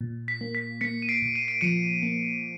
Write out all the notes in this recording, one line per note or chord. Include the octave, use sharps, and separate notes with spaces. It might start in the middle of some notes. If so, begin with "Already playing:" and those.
A#2
B6
A#3
B6
A#3 B6 C#7
D#7
C7 D7
A#2
D#7
D7
F3 C#7 D#7
A#3